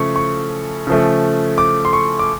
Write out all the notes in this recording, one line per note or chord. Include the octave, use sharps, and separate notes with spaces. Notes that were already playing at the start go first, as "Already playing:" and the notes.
Already playing: C#3 F3 A3 C#6
C#6
C#3 F3 A3
D6
C6
C#6
D6